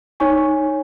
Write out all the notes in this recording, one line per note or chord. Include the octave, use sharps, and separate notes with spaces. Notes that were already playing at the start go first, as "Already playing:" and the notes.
D#4 C#5 G#5 C#6